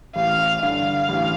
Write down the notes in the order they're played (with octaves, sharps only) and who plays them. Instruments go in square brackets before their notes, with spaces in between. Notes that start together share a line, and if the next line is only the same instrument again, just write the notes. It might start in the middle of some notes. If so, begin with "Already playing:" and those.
[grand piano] A1 [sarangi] F5
[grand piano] G2 D3 [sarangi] F5
[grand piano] A1